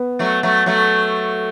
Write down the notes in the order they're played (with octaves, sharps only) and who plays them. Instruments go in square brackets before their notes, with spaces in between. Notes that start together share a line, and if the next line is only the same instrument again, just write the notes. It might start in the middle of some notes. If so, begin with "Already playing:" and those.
Already playing: [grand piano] B3
[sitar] F#3 A3
F#3 A3
F#3 A3